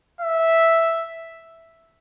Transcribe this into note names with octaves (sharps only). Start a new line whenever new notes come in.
E5